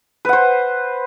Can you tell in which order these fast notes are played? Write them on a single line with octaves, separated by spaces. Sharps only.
B4 F#5 C5